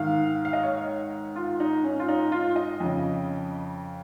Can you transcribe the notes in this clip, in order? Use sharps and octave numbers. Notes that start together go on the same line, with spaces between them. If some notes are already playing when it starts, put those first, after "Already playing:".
Already playing: G#2 D#3 F5
F5
D#5
C#5
F4
D#4
C#4
F4
D#4
F4
D#5
F2 C#3